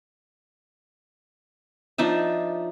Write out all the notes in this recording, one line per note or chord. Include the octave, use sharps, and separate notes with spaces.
F3 D4 D#4 E5